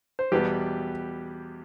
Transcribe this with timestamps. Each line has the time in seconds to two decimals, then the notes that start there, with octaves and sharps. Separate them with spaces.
0.19 C5
0.32 E2 B2 G3 G4 B4